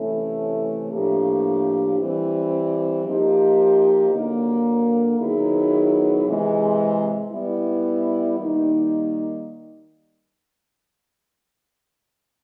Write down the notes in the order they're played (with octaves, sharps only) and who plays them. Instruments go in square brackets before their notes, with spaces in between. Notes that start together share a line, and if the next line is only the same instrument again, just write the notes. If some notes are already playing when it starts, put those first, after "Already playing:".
Already playing: [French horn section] C3 E3 A3 C#4 E4
A2 F3 A#3 D4 G4
E3 G3 C4
F3 A#3 D#4 G4 C5
D3 F#3 A#3
D#3 F#3 B3 E4 G#4
C3 E3 G#3
G3 B3 E4
D#3 G3 A#3 D#4